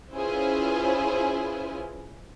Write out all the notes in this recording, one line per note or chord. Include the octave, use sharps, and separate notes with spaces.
C#4 E4 F4 G#4 B4 C5